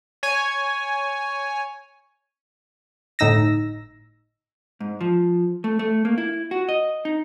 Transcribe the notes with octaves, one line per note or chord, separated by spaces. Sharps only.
C#5 G#5
G1 A2 D#4 E6 A#6
G#2
F3
A3
A3
A#3
E4
F#4
D#5
D#4